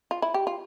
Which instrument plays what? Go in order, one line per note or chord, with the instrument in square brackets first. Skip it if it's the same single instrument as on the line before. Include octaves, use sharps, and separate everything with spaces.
[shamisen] F4
E4
G4
F4